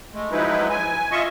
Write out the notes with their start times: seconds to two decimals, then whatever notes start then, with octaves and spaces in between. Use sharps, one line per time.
0.14 G#3 A3
0.32 F3 F#3 G#3 D#4 E4 B4
0.70 G#5
1.12 F4 D#5 E5 C#6